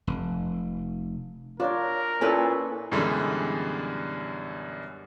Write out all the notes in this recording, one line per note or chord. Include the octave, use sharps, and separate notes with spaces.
F1
D4 F4 A#4 C#5 D5
A#2 C#4 E4 A4 B4 C#5 G#5
F#2 B2 D3 E3 G3 G#3